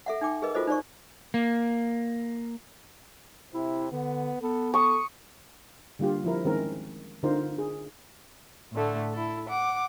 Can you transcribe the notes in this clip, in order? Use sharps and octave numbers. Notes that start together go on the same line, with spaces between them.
A4 E5 F#5
D#4 G5 D6
G#4 A#4 B4 D#5
F4 F#4 A4 C5 D#5
D#4 C5 D5 C#6
A#3
C3 E4
D3 B3
B3 A4
A4 C#6 D#6
D3 G3 A#3 F4 G4
F3 E4 A#4
D#3 G#3 C4 C#4 A#4
D3 C4 D#4 F4 A#4 C5
G#4
A2 D3 A3
E4 A4
F#5 D6